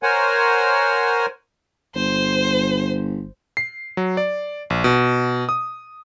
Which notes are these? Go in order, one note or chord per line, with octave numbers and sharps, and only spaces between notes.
A#4 C5 C#5 F#5 G#5
G1 C5
C7
F#3
D5
A#1
B2
D#6